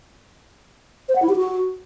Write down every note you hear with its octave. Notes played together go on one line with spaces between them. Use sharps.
C5
F#5
E4
G4
F#4